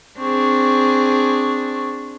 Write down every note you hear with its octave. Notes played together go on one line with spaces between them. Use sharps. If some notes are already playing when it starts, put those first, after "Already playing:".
C4 D4 G#4 C#6